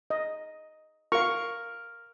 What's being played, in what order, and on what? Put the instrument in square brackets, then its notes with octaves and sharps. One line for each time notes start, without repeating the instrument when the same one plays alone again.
[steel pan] D#5
[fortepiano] A#4 [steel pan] F5 C#6